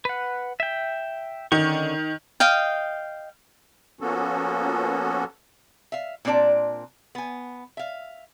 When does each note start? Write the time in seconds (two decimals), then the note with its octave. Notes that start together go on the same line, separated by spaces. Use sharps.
0.05 B4 F#5
0.60 E5 G5
1.52 D3 D#3 C#4 C#6
2.40 D#5 F5 G5
4.01 F3 A#3 B3 C#4 F#4 A4
5.92 E5 F5
6.25 A#2 C4 D4 D5 A5
7.15 B3 G#5
7.77 E5 F5